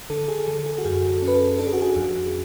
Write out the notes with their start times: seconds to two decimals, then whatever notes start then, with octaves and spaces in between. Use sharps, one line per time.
0.10 D3 A4
0.28 G#4
0.48 D3 A4
0.59 A4
0.66 G#4
0.78 F#4
0.85 F#2 G#4
1.09 A4
1.22 C#4
1.28 B4
1.34 A4
1.59 D4 A4
1.67 G#4
1.73 F#4
1.81 G#4
1.96 F2